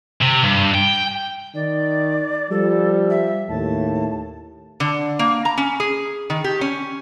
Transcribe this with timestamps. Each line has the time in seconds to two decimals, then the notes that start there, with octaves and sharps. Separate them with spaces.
0.22 C3
0.44 G2
0.75 G5
1.55 D#3 D5
2.51 F3 G3 A4
3.10 E5
3.49 D#2 A2 A5
4.80 D3
5.19 A#3
5.45 A#5
5.58 C#4
5.80 G#4
6.30 D#3
6.44 G4
6.61 C#4